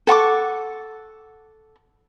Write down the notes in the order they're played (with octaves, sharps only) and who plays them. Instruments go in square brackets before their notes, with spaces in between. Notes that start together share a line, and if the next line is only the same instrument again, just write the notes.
[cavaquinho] A4 F#5 C#6 D6